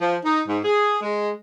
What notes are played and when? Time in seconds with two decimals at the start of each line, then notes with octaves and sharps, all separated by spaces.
0.01 F3
0.24 D#4
0.48 G#2
0.64 G#4
1.02 G#3